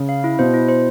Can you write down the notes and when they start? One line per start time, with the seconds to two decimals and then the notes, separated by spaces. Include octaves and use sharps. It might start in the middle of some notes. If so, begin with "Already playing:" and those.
Already playing: C#3
0.09 F5
0.24 E4
0.39 B2 C5
0.54 E4
0.69 C5